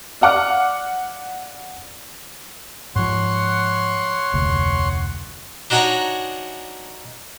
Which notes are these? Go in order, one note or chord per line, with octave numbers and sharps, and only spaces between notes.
D5 F5 F#5 D6 F6
G#2 F3 C#5 F#5 C6
F1 D2
D4 D#4 F#4 C#5 G#5 A#5